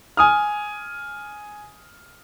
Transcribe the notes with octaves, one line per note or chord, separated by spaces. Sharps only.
G#5 D#6 F6